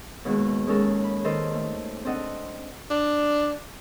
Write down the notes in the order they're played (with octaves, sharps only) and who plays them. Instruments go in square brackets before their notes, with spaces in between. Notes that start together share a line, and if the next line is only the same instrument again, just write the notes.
[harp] D#2 B2 G#3
G#3 C#4 A4 A#4
B5
D#3 A4 A#4 C5 D#5
A3
C4 D4 A4 D#5 F#5
[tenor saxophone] D4